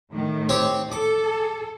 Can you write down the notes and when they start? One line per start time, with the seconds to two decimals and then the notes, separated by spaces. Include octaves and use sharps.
0.11 A2 D#3
0.49 C4 G4 C#5
0.92 A4 D6